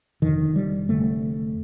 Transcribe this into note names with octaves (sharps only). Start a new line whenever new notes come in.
F1 F2 D3 D#3
G3
F1 F2 D3 A3